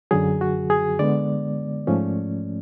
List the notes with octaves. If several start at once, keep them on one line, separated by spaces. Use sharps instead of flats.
F#2 D3 F#3 G#4
F#4
G#4
D3 G#3 B3 D5
G#2 F3 A3 C#4